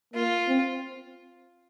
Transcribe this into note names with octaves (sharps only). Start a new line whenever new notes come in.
A#3 F4
C4